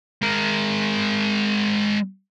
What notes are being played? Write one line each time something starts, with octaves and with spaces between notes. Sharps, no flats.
G#3 A#4